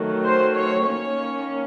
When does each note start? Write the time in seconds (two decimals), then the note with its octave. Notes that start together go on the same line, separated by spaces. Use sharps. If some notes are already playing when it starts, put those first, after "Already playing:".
Already playing: D#3 F#3 A3
0.24 C5
0.55 C#5
0.85 D#3 A#3 C#4 C#5